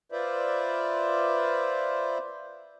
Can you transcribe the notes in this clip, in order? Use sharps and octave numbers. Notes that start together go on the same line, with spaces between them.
F4 B4 C5 D5 E5